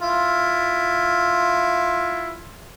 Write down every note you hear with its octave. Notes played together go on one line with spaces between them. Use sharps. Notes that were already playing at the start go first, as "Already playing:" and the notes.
E4 F4